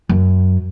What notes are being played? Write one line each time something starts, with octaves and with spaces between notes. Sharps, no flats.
F#2